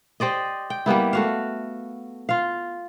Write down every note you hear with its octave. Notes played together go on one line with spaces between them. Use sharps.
G4 C5 D5 D#5
G5
G3 A#3 B3 E4
A3 F#4 F5
F4 F5